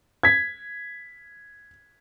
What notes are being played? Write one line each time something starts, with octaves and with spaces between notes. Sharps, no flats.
G#6 B6